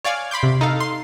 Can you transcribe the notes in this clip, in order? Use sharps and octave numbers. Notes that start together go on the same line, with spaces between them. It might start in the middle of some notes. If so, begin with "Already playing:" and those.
C#5 D5 F5 G#5
B5 C6 D6 G6
C3
D#4 A4 F5
C6